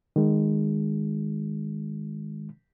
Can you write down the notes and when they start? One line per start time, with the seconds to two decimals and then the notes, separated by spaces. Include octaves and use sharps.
0.16 D#3 G#3